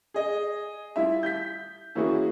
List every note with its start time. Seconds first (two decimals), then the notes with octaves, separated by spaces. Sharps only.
0.14 G#4 D#5
0.96 G3 E4 F4 E5
1.23 G6 B6
1.95 E3 A#3 C#4 E4 F#4 G#4